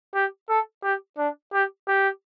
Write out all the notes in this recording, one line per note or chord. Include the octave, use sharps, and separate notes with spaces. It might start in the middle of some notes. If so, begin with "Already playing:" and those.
G4
A4
G4
D4
G4
G4